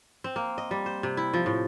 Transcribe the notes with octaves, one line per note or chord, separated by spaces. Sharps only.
C4
A#3
D#5
G3
C5
C3
E4
F3
A2